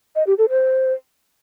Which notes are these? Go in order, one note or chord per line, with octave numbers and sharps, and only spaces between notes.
D#5
G4
A4
C5